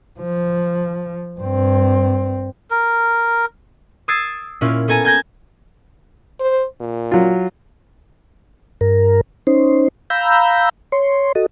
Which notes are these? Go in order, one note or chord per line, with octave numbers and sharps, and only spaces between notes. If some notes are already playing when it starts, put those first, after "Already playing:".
F3
G2 C4
A#4
D#6 E6 G#6 A6 C7 D7
A#2 C#4 E4 F4
B3 A4 G#5 A#5 D#7
G#5 A5 G6 G#6 A#6
C5
A#2
F#3 F4
G2 A#4
C#4 D#4 C5
F5 A#5 B5 E6 G6
C#5 C6
F#4 A4 D#5